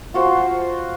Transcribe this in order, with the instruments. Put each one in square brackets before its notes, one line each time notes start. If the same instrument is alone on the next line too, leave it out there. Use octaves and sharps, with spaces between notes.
[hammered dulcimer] F4 F#4 C5